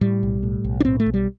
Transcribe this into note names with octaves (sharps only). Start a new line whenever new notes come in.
A2 G3
B1
A2
B1
D4
A2 C4
A3
B1
G3